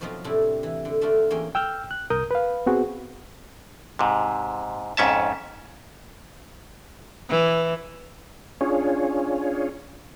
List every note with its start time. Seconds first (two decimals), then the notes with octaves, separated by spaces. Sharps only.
0.01 B2 F3 F#3 B3 C4 D#4
0.24 A2 C3 G3 D4 E4 A4
0.63 E3
0.85 D3
1.01 A3 D4 F4 F#4
1.30 E2 A#3 C#4 G#4 G5
1.55 G5 E6 F6 G6
1.91 F#6
2.10 C2 A#4 D#6 G6
2.31 B4 F5
2.66 B3 C4 F#4 G#4
3.99 G#2 C3
4.97 F2 G#2 C#4 E5 A5
7.30 E3
8.61 C#4 D4 F4 G#4 C#5